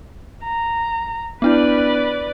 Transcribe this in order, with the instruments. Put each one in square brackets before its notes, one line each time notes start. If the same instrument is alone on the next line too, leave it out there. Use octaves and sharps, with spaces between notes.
[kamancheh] A#5
[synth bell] B3 D4 E4 [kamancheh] B4 D5